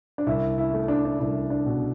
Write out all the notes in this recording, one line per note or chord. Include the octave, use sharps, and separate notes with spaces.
D4
C2 E4
E4
A3
D4
D4
C2 E4
D4
B2